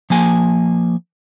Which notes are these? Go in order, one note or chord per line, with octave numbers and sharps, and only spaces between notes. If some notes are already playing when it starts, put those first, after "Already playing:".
F3 A#3 G#5